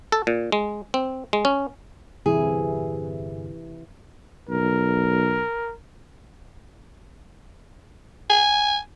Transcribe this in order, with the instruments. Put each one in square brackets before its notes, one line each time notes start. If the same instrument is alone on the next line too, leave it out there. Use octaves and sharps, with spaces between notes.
[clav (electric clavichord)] A4
A#2
G#3
C4
G#3
C#4
[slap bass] G1 E2 [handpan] C3 E3 E4 [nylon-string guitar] G#4
[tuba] B1 [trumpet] A#4
[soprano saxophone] G#5